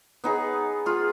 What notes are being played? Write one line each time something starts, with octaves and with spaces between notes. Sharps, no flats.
B3 D#4 G#4
F4 G#4